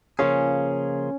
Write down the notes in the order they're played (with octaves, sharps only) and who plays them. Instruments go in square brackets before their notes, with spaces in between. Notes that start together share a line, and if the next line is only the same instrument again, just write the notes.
[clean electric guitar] C#3 F3 A#3 F4 G#4 [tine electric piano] C#4